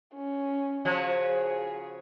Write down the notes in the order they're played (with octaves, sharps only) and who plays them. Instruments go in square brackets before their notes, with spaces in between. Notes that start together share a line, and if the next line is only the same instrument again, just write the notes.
[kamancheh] C#4
[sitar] C#3 F3 F#4
[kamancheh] G#4